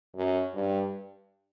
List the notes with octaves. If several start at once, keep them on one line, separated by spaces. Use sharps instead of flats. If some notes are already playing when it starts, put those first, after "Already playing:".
F#2
G2